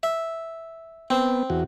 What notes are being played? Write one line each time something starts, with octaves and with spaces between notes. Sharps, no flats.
E5
B3 C4
E2 F#4